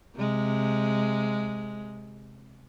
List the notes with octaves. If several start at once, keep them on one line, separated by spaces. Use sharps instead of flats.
C3 G#3